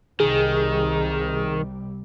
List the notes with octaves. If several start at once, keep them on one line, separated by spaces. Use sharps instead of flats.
C2 C3 D#3 G3 G#4